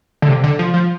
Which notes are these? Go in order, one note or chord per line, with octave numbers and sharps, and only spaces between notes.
D3
C3
D3
F3
F3